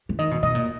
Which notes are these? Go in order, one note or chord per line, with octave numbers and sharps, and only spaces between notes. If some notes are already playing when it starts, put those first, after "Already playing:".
E3
D#3 D#5
B2
B2 D#5
A#2